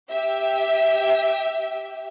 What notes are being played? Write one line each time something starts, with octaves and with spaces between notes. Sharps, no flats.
G4 E5